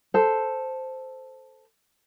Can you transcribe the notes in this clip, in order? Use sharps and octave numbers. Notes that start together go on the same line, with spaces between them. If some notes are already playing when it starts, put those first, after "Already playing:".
A4 C5